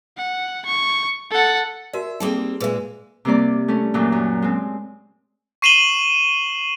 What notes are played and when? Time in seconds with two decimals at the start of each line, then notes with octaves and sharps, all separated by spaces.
0.17 F#5
0.65 C#6
1.31 A4 F#5
1.93 F#4 A#4 D5 E5
2.20 G3 A#3 C4 D#4 G#4 A4
2.60 A#2 G#3 G#4 B4 E5
3.25 C3 G3 A#3 C4 D5 D6
3.68 A3 C#4
3.94 F#2 A#2 E3 F#3
4.12 F#2
4.42 G#3 C4
5.62 C#6 C7 D#7 E7 F#7 G7